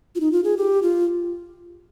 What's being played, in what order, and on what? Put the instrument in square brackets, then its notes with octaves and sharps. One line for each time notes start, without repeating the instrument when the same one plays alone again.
[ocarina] F4
D#4
F4
G#4
G4
F4